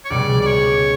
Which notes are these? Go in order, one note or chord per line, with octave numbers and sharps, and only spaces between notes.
C#5
C#2 B2 G3 D5
D5
C#5